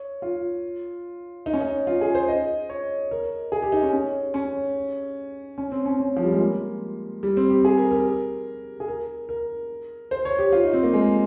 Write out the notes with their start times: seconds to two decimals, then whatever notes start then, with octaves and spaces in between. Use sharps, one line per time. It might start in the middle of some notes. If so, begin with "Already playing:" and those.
Already playing: C#5
0.22 F4
1.46 D#4
1.53 C#4
1.61 D#4
1.87 F4
2.01 G#4
2.15 C5
2.28 D#5
2.70 C#5
3.11 A#4
3.52 G#4
3.62 G4
3.72 D#4
3.83 C#4
3.93 C#4
4.34 C#4
5.58 C#4
5.72 C4
5.86 C#4
5.99 C#4
6.17 F3
6.24 G3
6.32 G#3
6.40 A#3
7.23 G3
7.37 C4
7.50 G4
7.65 G#4
7.78 A#4
7.91 A#4
8.80 G#4
8.88 A#4
9.29 A#4
10.11 C5
10.25 C#5
10.38 G4
10.52 F4
10.63 D#4
10.73 C4
10.83 A#3
10.94 G#3